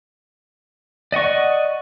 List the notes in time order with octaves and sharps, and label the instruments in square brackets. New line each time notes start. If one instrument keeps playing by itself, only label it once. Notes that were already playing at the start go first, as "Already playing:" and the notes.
[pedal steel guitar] D5 D#5 F#5 C#6